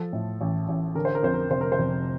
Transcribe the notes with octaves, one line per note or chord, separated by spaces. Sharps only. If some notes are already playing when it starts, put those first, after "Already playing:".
Already playing: F3 A4
A2
A1
A1
D3 A#4
C5
A#4
F2 C5
A#4
F1 C5
A#4
C5
F1